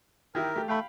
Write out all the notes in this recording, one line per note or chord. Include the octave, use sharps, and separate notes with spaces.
D#3 E4 G4 A#4
A3 G4
A3 F5 G5 B5